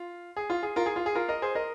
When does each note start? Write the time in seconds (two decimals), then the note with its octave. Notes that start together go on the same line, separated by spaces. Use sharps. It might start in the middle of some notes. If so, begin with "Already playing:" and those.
Already playing: F4
0.37 G#4
0.50 F4
0.63 G#4
0.76 F4 A#4
0.86 G#4
0.96 F4
1.06 G#4
1.15 F4 A#4
1.28 A#4 D#5
1.42 G#4 C5
1.55 A#4 D#5